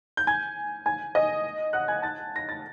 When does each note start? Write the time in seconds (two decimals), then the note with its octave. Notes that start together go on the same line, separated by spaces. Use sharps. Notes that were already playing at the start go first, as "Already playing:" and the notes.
0.17 G6
0.27 G#5 G#6
0.86 G#5 G#6
1.15 D#5 D#6
1.73 F#5 F#6
1.88 G#5 G#6
2.02 A5 A6
2.36 A#6
2.49 A6